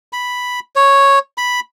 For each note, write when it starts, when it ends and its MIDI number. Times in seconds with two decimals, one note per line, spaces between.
0.13 0.60 83
0.76 1.19 73
1.38 1.60 83